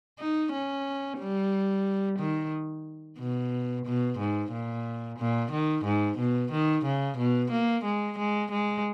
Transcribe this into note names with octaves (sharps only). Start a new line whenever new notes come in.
D#4
C#4
G3
D#3
B2
B2
G#2
A#2
A#2
D#3
G#2
B2
D#3
C#3
B2
A#3
G#3
G#3
G#3